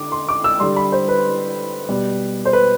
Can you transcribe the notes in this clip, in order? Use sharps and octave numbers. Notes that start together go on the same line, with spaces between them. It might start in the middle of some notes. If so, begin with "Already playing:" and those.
Already playing: D3 D6
C6
D6
E6
D3 G3 C6
B5
C5
B4
B2 G3
C5
B4